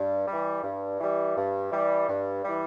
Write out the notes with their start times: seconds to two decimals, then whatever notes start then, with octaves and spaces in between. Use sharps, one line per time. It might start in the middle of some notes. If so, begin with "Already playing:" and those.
Already playing: G2
0.27 E3 G3
0.63 G2
1.00 E3 G3
1.36 G2
1.71 E3 G3
2.08 G2
2.44 E3 G3